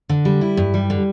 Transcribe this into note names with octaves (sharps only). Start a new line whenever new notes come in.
D3
G3
E4
G2
G3
D3